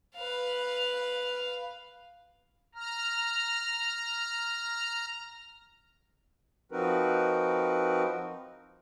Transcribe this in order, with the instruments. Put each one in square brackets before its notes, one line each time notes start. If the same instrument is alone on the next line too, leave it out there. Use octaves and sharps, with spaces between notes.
[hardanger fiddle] B4 F5
[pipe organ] A#5 F6
[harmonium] F3 C4 D#4 F#4 A#4 B4